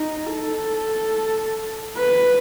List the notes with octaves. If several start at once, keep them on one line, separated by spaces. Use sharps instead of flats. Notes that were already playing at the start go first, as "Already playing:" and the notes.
Already playing: D#4
A4
B4